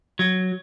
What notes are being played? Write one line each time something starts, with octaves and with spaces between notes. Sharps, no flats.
F#3